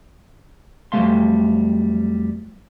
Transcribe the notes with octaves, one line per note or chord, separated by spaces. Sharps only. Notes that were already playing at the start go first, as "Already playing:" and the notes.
F2 F#3 G3 A3 F5 C6